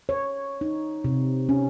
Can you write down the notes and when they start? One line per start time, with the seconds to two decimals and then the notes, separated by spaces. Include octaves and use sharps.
0.09 C#5
0.61 D#4
1.04 C3
1.49 C#4